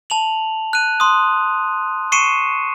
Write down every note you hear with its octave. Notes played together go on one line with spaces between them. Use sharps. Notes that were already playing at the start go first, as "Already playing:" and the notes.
A5 F7 F#7
F#6 D#7
C6 D#6
C#6 C7 C#7 D#7 E7